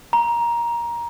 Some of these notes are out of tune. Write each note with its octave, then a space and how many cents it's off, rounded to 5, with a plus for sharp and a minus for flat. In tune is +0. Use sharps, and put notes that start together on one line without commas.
A#5 +15